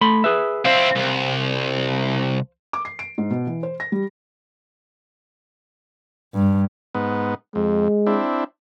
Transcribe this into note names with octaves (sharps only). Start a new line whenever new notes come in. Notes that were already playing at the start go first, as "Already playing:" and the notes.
A3 B5 C6
G#4 B4 E5
C4 E4 C5 F5
C2
D6
C7
D7
G#2
B2
E3
C5
A#6
G3
G2
G#2 B3
F2 G#3
C4 D4 E4